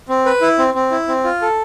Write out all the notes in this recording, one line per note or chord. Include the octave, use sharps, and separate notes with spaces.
C4
B4
E4
C4
C4
E4
C4
F4
A4